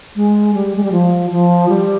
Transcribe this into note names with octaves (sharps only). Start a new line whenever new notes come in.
G#3
G3
G#3
G3
F3
F3
G3